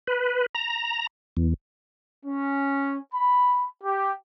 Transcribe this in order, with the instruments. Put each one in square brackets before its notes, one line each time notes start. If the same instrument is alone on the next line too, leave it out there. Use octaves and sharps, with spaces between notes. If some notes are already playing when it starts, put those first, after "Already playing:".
[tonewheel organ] B4
A#5
E2
[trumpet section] C#4
B5
G4